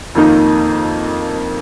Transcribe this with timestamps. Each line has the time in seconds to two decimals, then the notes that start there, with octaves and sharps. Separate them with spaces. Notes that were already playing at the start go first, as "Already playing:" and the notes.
0.15 F2 D#3 A#3 D#4